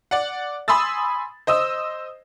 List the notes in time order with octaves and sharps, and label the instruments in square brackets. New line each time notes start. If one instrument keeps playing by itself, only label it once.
[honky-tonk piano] D5 F#5
G#5 B5 C6 D#6 E6 A6
C5 D#5 D#6 E6